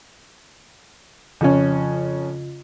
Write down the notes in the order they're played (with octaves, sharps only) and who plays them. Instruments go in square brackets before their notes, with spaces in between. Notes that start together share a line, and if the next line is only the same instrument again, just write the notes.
[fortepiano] F2 C#4 [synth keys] C#3 F4